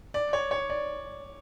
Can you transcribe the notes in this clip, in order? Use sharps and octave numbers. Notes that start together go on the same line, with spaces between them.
D5
C#5
C#5
D5